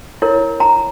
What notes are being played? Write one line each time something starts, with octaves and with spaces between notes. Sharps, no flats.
E4 A#4 C#5
A#5